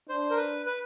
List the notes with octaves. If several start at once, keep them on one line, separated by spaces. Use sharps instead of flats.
D4 C5
A#4
B4
B4